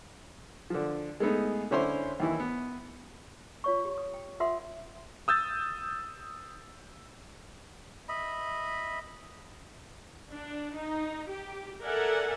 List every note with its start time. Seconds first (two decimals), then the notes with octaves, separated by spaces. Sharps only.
0.70 D3 F3
1.20 G#3 A3 B3 D#4
1.71 D3 C#4 E4 C5 C#5 C6
2.20 D#2 E3 E4
2.40 B3
3.64 F4 C#5 C#6
3.85 G4
3.98 D#6
4.14 G5
4.40 F4 A#4 E5 F#5 C6 D#6
5.28 D#6 E6 G6 A6
8.09 D#5 E5 B5
10.31 D4
10.75 D#4
11.29 G4
11.83 A4 A#4 D5 E5 F#5 G#5